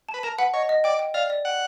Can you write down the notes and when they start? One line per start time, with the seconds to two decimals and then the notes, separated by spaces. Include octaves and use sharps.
0.09 A5
0.14 B4
0.23 A#4 A5
0.38 B4 F#5
0.53 C#5 D#5
0.69 D#5
0.84 D5 G5
0.99 G5
1.14 D5 F5
1.30 D5
1.45 F#5 G5